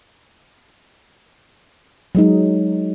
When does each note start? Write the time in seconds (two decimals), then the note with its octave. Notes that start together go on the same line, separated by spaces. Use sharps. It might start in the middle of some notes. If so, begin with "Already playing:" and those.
2.15 F#3 G#3 D#4